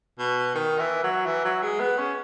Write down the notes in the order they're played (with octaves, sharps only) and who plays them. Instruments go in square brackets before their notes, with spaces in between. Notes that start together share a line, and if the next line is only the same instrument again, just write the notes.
[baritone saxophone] B2
D#3
E3
F#3
E3
F#3
G#3
B3
C#4